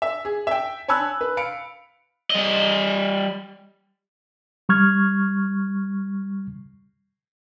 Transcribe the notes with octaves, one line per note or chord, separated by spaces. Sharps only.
E5
G#4
E5 G5
C#5 G#5 A5 B5 E6 F#6
B4
F5 B5 C#7 D7
G3 D#5
G3 C#6 F6 G#6